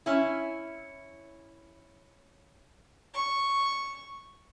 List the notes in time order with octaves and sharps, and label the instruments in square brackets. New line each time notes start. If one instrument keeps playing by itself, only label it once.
[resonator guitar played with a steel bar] C#4 E4
[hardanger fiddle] C#6